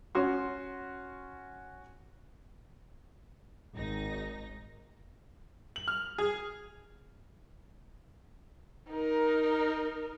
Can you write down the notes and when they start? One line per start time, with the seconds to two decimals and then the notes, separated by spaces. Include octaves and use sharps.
0.15 C#4 F#4 C6
3.74 G#1 D#4 A#6
5.76 F#7
5.88 F6
6.18 G#4
8.90 D#4 A#4